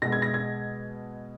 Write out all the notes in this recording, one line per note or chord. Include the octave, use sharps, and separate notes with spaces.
B2 G#3 B3 A#6
G#6
A#6
G#6